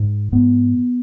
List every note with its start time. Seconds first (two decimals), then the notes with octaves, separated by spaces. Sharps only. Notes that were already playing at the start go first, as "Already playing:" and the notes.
Already playing: G#2
0.32 G#2 B3